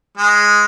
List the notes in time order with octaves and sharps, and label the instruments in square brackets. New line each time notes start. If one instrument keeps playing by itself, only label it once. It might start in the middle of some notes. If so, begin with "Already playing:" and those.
[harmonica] G#3